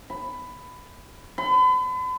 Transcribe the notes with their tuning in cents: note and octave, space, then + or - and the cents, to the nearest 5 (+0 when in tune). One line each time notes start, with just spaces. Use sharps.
B5 +15
B5 +40